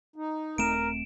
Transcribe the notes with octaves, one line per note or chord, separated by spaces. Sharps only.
D#4
D#1 A3 C4 A#4 D7 E7